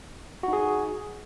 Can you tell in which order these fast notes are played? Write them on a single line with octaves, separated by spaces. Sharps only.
F#4 D#4 G#4